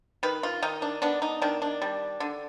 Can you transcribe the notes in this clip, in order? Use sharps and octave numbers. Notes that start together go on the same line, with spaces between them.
D#3 B4
F4
D#3 D#4
D4
B3 D4
D#4
D#3 D4
D4
G3
D3